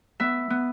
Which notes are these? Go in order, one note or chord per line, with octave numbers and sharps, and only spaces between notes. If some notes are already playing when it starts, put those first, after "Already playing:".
B3 E5
B3